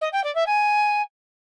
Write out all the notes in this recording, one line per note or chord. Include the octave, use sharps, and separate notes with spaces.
D#5
G5
D5
E5
G#5